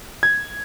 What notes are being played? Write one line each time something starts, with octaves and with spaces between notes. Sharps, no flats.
G#6